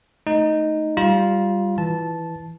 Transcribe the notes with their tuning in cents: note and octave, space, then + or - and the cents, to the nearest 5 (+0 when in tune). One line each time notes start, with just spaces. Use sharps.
A3 +0 D#4 +0
G3 +0 F4 +0 A#5 +40
E3 +0 A5 -10